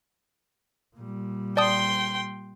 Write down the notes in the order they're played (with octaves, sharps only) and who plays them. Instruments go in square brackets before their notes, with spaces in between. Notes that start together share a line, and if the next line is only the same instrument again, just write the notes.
[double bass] A#2 G3
[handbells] D5 A5 D#6 [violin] G5 C6